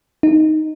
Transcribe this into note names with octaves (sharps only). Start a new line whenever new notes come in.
D#4